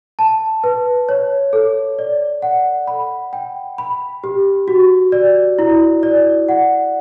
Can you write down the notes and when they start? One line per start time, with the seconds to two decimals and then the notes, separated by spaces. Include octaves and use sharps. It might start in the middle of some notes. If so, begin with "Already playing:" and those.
0.19 A5
0.64 B4
1.09 C#5
1.53 A4
1.99 D5
2.42 F#5
2.87 B5
3.33 G5
3.78 B5
4.24 G4
4.68 F#4
5.12 D5
5.59 E4
6.03 D5
6.49 F#5